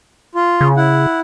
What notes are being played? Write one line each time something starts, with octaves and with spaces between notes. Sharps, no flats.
F4
C#3
E4 F#5